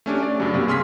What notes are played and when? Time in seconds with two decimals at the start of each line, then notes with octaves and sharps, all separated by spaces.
0.06 A3 C#4 D4 G4
0.23 D5
0.40 G2 C#3 F#3
0.53 G2 C3 A#3
0.67 C2 G#4 C6 F6 B6